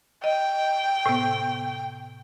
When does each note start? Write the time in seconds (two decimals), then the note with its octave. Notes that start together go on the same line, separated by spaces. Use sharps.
0.24 D#5 G5
1.06 A2 C3 B3